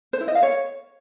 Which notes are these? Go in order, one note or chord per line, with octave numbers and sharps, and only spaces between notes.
C5
E4
D#5
F5
C#5